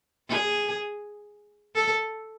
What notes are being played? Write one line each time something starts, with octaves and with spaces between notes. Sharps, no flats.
G#4
A4